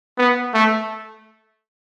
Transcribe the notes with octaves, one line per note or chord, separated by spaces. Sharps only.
B3
A3